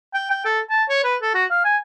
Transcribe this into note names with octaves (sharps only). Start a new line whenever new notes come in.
G5
G5
A4
A5
C#5
B4
A4
F#4
F5
G#5